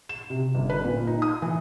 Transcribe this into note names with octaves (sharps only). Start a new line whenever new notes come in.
E7
C3
G1
B4
A#2
D#4
D#6
E3